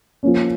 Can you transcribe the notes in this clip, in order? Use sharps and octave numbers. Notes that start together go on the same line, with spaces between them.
F3 A#3 C#4